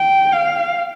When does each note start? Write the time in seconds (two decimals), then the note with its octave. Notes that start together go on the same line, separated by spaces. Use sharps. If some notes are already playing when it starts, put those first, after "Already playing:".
Already playing: G5
0.32 F5